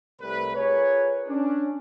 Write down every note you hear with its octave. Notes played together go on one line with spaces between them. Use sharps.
C2 C3 G3 A3 A#4 B4
F4 G#4 A#4 B4 C#5
C#4 D4